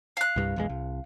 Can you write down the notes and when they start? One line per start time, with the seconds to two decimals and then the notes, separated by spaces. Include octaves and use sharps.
0.17 F5 F#6
0.36 C2 G2
0.56 A#1 E2 G#3
0.69 C2